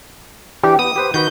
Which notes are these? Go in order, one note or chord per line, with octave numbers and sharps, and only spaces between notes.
E3 D4 G4
B3 D#6
G4 B4 C5
D#3 F#4 B4 G6